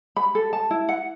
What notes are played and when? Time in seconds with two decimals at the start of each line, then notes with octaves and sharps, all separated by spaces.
0.16 B5
0.35 A4
0.53 A5
0.71 E4
0.89 F#5